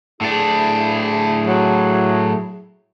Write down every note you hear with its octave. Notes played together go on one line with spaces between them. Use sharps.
A2 D4 E4 G#4
F#3